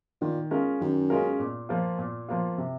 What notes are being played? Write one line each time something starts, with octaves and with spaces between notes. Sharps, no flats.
A#2 D#3
G#3 C#4 F4 A#4
F#2 D#3
G#3 C#4 F4 A#4
A#2
F3 A#3 F4
A#2
F3 A#3 F4
C3